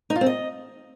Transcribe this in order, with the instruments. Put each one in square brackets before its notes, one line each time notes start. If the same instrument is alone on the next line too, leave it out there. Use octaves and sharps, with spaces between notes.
[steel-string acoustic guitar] D#4
F4
C4
D#5